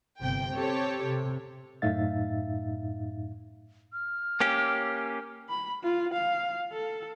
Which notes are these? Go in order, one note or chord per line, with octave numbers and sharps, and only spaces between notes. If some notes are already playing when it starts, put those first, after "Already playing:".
G1 C3 G5
C4 G4 A4 C#5
C3
F#2 A2 D#4 E5 F5 A6
F6
A#3 C#4 G4
B5
F4
F5
A4